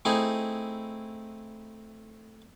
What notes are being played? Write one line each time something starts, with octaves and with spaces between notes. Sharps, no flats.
A3 C4 D#4 E4 G#4